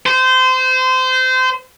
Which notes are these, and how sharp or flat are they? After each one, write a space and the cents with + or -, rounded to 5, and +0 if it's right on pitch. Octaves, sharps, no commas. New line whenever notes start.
C5 -25